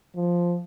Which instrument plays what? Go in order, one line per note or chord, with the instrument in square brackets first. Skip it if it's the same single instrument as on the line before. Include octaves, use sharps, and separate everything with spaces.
[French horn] F3